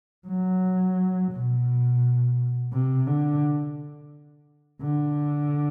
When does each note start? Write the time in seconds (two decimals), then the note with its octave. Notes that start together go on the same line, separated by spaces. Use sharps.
0.28 F#3
1.32 B2
2.73 C3
3.07 D3
4.81 D3